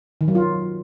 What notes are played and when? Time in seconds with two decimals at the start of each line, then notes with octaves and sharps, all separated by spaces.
0.21 D#3
0.28 F#3
0.35 F4